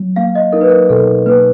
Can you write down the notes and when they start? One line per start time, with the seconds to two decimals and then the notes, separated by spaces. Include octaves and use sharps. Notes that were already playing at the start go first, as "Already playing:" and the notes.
Already playing: F#3
0.16 A#3 F5
0.35 D#5
0.53 D#4 A#4
0.61 B4
0.70 A#4
0.89 B2 A4
1.26 A#3 B4